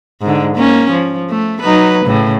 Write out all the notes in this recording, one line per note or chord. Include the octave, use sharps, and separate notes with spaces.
G#2 D3
A#3 C#4
F3
A3
F#3 D#4 B4
A2 C#3